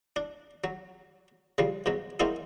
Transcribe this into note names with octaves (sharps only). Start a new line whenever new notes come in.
D4
F#3
C#3 F3 G3
G#2 B2 F#3
F#3 G#3 A#3 C4 D#4 E4